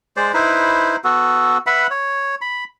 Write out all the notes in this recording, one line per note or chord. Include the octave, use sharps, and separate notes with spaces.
G#3 C5 D5
D#4 E4 B4 C5
B3 F#4 A4
B4 E5 F#5 B5
C#5
B5